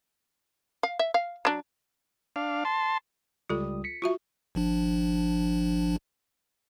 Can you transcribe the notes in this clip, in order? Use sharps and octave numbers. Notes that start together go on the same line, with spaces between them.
F5
E5
F5
F#3 D4
D4 F5
A5 C6
C#2 G3 F4 A4 D#6
B6 C#7
F4 F#4 E5 C#6
G#1 F3 D4